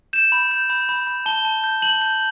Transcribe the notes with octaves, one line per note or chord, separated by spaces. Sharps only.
G6 E7
B5
G6
B5
B5
B5
A5 G7
A5
G6
A5 F#7
G6